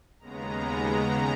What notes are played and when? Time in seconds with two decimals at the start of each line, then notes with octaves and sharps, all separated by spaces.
0.20 D#2 C#3 G#3 B3 A#5
0.71 A#5